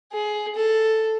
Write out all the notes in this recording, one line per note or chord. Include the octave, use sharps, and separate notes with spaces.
G#4
A4